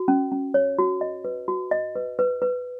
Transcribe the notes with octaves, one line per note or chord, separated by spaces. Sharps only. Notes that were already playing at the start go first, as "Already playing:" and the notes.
Already playing: F#4
C#4
C#4
C#5
F#4
D#5
B4
F#4
D#5
B4
B4
B4